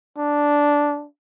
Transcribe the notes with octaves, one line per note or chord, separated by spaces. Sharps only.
D4